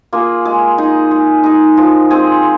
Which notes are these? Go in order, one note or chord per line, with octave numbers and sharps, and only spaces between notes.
A#3 F4 G#4
G#3
D#4 G#4
G#3
D#4 G#4
F3
G#3 C4 G#4